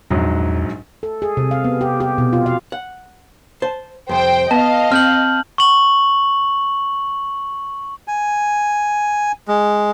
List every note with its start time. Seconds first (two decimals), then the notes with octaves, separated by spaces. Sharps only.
0.10 A#1 E2 G#2 F#3
1.03 A4
1.22 G#4
1.37 C3
1.51 F5
1.64 B3
1.81 G4
2.00 G4
2.18 B2
2.33 F4
2.46 F5
2.72 F#5
3.62 C5 A5
4.09 C2 F2 C5 G5
4.51 B3 D#5 F5 A5
4.92 C4 F6 G6 F#7
5.58 C#6 F#7
8.08 G#5
9.48 G#3